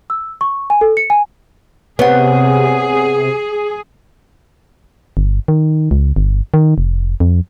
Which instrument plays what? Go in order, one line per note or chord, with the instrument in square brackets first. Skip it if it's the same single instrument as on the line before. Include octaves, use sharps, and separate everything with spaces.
[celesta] E6
C#6
G#5
A4
C#7
G#5
[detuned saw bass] C3 [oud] B3 [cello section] G#4 [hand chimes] C#5 F#5
[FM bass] G1
D#3
C#2
G1
D#3
F1
F2